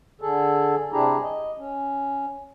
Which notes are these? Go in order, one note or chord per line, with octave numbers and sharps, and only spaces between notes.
D3 G#4 A4
C3 D4 E4 G4 G#4 A#5
D#5
C#4